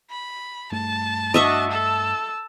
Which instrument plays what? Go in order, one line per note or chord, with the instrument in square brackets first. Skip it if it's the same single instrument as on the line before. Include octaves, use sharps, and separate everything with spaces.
[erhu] B5
[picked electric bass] G2 A3 [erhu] A5
[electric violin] D4 F#4 [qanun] D#5 E5 C#6
[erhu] A4 [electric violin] A5 E6